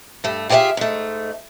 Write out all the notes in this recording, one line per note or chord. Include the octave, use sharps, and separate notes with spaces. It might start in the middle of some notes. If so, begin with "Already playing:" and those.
G2 A3
F4 G4 G#4 C#5 E5 F5
G#2 A3